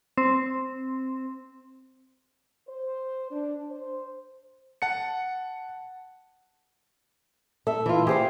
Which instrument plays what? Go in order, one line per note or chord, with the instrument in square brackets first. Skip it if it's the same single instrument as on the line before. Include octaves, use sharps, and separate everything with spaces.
[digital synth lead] C4
[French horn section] C5
D4
C5
[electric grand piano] F#5 A5 C#7
[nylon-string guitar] A4 [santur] E5
[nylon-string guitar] E3 F4
[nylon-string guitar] G4 [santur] G#4 C5 F5